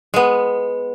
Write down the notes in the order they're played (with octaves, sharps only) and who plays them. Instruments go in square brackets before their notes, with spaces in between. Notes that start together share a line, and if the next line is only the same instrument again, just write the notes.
[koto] G#3 B3